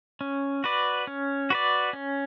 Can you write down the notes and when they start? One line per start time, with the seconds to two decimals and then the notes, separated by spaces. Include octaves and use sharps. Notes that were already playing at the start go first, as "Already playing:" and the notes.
0.21 C#4
0.64 F#4 B4 D5
1.07 C#4
1.50 F#4 B4 D5
1.93 C#4